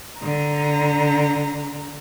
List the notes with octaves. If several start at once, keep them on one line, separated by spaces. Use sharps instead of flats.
D3 A#5